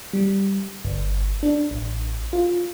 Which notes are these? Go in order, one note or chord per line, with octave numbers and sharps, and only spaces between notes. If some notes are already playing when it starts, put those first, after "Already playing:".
G3
G1
D4
A1
F4